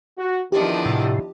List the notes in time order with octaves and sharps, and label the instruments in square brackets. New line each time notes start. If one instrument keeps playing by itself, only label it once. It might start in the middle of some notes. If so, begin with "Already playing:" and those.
[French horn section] F#4
[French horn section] E2 D#3 E4 [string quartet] F3 D4 D#5 [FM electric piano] G4
[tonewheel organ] A2 C3